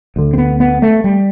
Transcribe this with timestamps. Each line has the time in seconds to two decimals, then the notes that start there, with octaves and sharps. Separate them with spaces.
0.16 D2 D3
0.33 C4
0.38 B3
0.60 B3
0.82 A3
1.04 G3